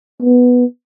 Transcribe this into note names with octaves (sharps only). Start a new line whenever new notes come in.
B3